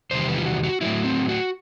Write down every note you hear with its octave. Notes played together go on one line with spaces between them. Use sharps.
E2 C3 D#3 G3 C5
B4
F4
F#4
F#4
A2 F#3 E4
C4
F#4